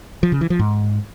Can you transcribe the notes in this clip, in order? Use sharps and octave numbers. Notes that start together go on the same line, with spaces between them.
F3
C#3
E3
F3
G#2